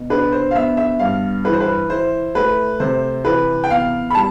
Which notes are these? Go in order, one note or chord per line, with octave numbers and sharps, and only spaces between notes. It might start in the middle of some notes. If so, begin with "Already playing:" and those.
Already playing: B2
D4 B4
C5
F5
B3 E5
E5
G2 F5
E3 B4
C5
B4
E4 C5
A3 B4
C3 C5
E3 B4
G5
B3 F5
B5
G3 A5